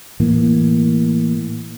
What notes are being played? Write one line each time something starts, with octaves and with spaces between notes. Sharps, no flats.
A2 E3 A#3